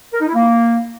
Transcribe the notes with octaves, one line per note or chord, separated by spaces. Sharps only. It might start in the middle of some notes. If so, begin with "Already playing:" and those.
A#4
D#4
E4
A#3